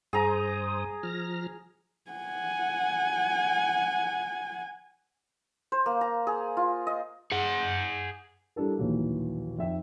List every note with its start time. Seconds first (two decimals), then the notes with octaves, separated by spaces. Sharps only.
0.13 G2 G#4 C5 A#5 D#6
1.03 F3 F6 A#6
2.11 F#5 G#5
5.72 C5
5.86 A#3
6.01 A#5
6.27 G#4
6.57 F4
6.87 D#5
7.32 G#4 F#5
8.56 G3 D4 E4 A4 A#4
8.78 A#1 D#2 B2 E3 F#3 A#3
9.59 F2 D#4 E5 G5